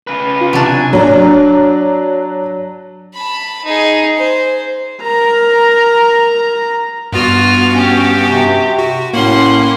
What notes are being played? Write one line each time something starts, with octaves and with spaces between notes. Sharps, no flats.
C#3 B4
F4
C3 F#3 D4
G#5
F#3 D4
A5 B5
D#4 G#4
C5
A#4 A#5
G2 B3 F4 F#4 F6
C#4 G4
C3
F#4
A2 A#3 C#4 F#5 C6